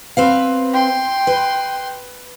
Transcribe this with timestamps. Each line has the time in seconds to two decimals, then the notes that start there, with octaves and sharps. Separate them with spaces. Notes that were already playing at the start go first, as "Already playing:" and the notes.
0.17 C4 B4 F5
0.73 G5 C6
1.27 B4